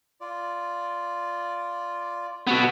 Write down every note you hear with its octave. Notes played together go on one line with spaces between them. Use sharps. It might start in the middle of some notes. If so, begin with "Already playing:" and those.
F4 D5
B3 F#4 G4 A4 F#5